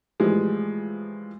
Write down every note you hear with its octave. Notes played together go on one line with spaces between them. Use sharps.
A2 E3 F3 G3 G#3